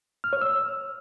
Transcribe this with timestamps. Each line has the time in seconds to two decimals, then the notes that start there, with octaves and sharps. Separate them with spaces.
0.24 F6
0.33 C#5
0.41 E6